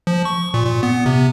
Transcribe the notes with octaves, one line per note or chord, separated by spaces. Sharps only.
F3
C#6
A#2
A#2
B3
C3